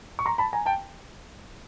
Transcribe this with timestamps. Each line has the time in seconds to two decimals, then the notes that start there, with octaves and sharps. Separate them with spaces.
0.19 C#6
0.26 A#5 C6
0.38 A5 B5
0.53 G#5 A#5
0.66 G5 A5